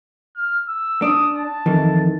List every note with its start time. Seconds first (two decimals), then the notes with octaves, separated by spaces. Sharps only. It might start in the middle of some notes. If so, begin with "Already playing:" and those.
0.36 F6
0.68 E6
1.02 D4 D#6
1.38 A5
1.66 F2 D#3 E3